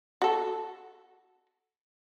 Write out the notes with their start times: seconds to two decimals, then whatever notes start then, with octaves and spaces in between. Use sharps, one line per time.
0.22 F#4 A4